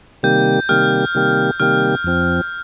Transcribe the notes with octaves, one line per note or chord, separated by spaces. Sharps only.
C3 D#3 G3 A#3 G4 G6
C3 D#3 G3 A#3 G4 F6
C3 D#3 G3 A#3 G4
C3 D#3 G3 A#3 G4 F6
F2 F3 C4